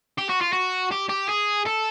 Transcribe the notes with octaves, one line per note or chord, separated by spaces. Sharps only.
G4
F#4
F4
F#4
G4
G4
G#4
A4